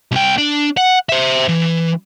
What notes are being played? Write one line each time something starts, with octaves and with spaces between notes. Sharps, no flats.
C2 G5
D4
F#5
C5 E5
E3